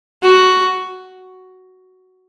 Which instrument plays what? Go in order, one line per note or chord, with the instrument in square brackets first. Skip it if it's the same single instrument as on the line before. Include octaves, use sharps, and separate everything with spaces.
[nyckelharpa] F#4